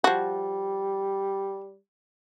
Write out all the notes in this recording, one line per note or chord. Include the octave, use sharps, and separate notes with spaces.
F3 G3 F#4